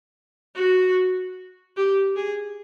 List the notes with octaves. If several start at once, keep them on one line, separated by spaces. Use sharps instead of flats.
F#4
G4
G#4